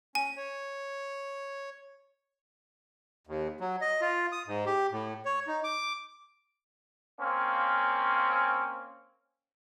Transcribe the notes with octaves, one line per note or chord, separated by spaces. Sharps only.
C#4 G#5
C#5
D#2
F#3
D#5
F4
D#6
G#2
G4
A2
C#5
D#4
D6
A#3 C4 C#4